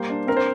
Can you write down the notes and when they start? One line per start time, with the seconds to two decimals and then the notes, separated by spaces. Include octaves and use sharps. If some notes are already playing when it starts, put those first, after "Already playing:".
Already playing: G3 A#3 C5
0.10 D4
0.27 C4 A#4
0.37 C5